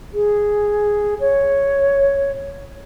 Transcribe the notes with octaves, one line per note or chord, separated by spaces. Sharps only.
G#4
C#5